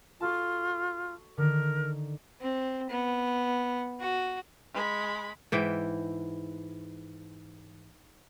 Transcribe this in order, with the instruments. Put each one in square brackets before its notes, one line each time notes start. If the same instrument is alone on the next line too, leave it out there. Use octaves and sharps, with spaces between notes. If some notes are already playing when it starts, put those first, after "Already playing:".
[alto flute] F4 [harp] F#4 A4 A5
[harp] D3 D#3 [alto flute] A#4
[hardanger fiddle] C4
B3
F#4
[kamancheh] G#3 B5
[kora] G#2 E3 E5 G5